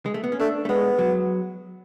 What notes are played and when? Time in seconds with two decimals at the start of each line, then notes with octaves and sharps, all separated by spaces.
0.06 G#3
0.14 A3
0.24 B3
0.32 C#4
0.40 A3 D4
0.65 A3
0.69 G#3 B3
0.99 F#3